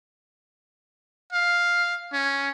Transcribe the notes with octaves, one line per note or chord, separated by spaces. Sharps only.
F5
C#4